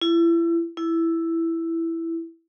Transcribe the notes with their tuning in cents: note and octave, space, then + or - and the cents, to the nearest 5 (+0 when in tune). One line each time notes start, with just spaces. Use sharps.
E4 +30
E4 +5